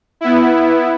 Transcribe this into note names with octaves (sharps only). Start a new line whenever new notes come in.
B3 E4